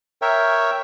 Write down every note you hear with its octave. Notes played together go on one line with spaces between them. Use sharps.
A#4 C#5 E5 G5